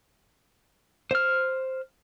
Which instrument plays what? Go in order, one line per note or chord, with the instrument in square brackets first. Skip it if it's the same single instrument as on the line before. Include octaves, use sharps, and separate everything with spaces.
[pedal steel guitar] C5 F6